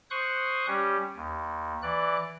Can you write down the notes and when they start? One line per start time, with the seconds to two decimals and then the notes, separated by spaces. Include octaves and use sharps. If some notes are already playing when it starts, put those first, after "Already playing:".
0.11 C5 C6 C#6 D#6 F#6
0.67 G3 C#4 G4
1.16 D#2
1.83 E3 D5 F#6